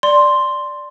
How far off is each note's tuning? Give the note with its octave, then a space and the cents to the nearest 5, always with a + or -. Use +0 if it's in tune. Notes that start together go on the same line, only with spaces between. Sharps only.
D5 +0 C6 +0